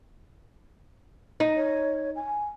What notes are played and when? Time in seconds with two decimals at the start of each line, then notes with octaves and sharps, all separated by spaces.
1.40 D#4
1.56 C#5
2.16 G#5